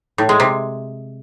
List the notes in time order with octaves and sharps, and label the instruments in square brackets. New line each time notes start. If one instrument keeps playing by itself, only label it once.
[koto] A2
G#3
C3